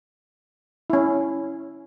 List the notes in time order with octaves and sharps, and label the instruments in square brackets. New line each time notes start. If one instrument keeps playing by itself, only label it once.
[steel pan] C#4 E4